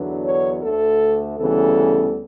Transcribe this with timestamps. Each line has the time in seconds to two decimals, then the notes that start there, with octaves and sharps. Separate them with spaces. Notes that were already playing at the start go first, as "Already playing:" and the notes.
Already playing: E2 D3 F#3 B3 D4
0.24 C#5
0.62 D2 D3 A3 A4
1.39 D2 C#3 E3 G3 B3 A4